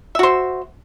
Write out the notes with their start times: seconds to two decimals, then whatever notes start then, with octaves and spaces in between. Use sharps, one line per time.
0.15 E5
0.19 F#4
0.23 C5